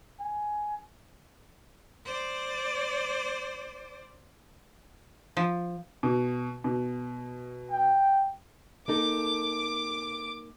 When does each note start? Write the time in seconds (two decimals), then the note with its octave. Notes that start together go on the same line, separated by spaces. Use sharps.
0.20 G#5
2.06 C5 D5
5.37 F3
6.03 B2
6.64 B2
7.72 G5
8.88 A#3 D#4 A4 D6